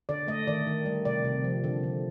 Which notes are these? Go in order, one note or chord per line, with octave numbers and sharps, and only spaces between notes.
D3 D5
A3 D#5
D#3 D5
D#3
G3
C3 D5
C3
F3
D3
D3